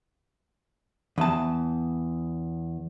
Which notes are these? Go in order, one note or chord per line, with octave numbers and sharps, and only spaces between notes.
E2 A5